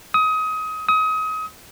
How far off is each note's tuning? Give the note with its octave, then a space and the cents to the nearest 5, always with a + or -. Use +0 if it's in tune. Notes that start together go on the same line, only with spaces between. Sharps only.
D#6 +25
D#6 +30